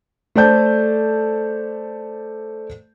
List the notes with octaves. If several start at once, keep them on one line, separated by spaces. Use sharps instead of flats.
A3 A4 C5 D5 A5 G6